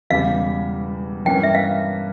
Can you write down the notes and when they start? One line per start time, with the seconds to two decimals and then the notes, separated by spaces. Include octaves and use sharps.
0.10 E1 E2 C#3 G3 F5
1.25 G2 E3 A#3 C#4 G5
1.43 E5
1.55 F5